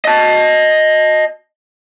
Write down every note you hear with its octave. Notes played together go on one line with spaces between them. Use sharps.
D#5 A5